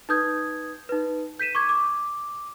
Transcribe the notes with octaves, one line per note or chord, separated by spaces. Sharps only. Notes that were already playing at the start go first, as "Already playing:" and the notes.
D#4 B4 D#6 G6 G#6
D#4 B4
G6 B6 D#7 E7
C#6 D6 G#6
D6